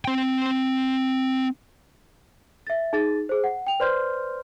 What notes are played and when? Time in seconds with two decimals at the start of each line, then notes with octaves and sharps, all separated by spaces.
0.05 C4 G5
2.67 E5 A6
2.93 D#4 G#4 A6
3.29 G#4 C5
3.44 F#5
3.67 G5 F7
3.80 B4 C5 D5 C6 F6 G6